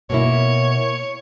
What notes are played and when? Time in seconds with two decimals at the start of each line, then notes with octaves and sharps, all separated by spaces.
0.10 B2 A#3 E4 C#5